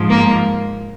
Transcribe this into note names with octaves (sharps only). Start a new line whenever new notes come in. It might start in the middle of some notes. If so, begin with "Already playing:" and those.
Already playing: G#2 F3
A#3